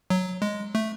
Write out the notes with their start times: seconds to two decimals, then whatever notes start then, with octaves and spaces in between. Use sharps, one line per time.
0.10 F#3
0.42 G#3
0.75 A3